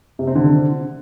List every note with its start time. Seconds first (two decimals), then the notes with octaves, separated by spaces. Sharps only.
0.19 C3
0.27 C4
0.35 D3